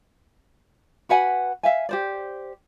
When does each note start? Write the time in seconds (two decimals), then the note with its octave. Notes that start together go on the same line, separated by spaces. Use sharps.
1.09 F#4 B4 F#5 G#5
1.63 E5 F5 G#5
1.89 G4 C5 D5